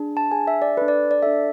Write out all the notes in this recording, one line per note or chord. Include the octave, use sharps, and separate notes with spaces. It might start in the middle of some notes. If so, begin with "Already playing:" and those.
Already playing: D4 G#4
A5
D4 G#4 G#5
E5
D5
D4 A4 B4
D5
D5
D4 A4 E5